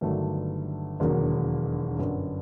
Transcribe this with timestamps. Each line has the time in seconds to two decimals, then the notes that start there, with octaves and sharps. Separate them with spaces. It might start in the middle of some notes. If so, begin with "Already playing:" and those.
0.01 G1 G2 D#3 F#3 A3
1.00 E1 D#2 D3 F#3 A#3
1.99 G1 F#2 D3